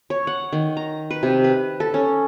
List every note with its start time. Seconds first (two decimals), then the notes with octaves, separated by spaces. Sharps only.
0.10 C#5
0.27 F#5
0.53 D#3
0.77 A#5
1.11 B4
1.23 C3
1.44 B4
1.80 A4
1.94 C#4